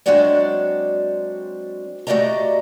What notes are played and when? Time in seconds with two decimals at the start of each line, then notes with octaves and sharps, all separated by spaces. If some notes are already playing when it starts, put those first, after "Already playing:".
0.06 F#3 G#3 C4 D4 F#4 D5
2.07 A3 F#4 G4 D5 D#5 A#5